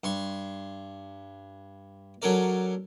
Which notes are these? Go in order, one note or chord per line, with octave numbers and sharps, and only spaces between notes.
G2 C6 C#6
F#3 C#4 A4 A#4 D5